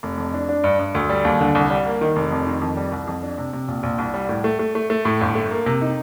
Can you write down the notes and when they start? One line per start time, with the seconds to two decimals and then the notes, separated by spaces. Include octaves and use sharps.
0.03 F1
0.18 F2
0.34 D4
0.49 D4
0.64 G2
0.79 G2
0.95 D2
1.09 G3
1.25 D#2
1.40 D3
1.55 C2
1.70 G3
1.86 A#3
2.01 D#3
2.16 F1
2.32 F2
2.47 D#3
2.62 F2
2.77 G3
2.92 C2
3.07 F2
3.23 D4
3.38 C3
3.53 C3
3.68 A#1
3.83 A#1
3.98 C2
4.14 G3
4.29 A2
4.44 A3
4.59 A3
4.75 A3
4.90 A3
5.05 A2
5.21 G1
5.35 A3
5.51 A#3
5.66 C3
5.81 D#4